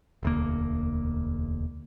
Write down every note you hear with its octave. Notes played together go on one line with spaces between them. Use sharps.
E1 D2 A#3